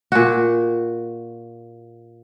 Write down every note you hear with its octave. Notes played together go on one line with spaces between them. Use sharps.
A#2 F#4